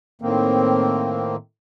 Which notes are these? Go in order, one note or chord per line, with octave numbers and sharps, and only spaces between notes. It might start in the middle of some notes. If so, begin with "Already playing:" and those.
A2 D#3 A#3 C4